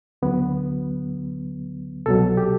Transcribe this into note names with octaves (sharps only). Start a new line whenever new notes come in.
D2 D3 F#3 B3
C2 B2 F#3 A4
G4